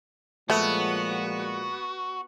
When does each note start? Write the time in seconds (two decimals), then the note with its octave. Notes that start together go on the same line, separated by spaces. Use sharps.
0.50 A#2 F3 G#3 A3 B3 F#4